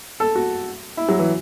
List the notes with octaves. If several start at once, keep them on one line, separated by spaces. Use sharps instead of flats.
A4
F#4
E4
F#3
E3